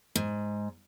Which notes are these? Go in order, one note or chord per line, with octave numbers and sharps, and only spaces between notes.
G#2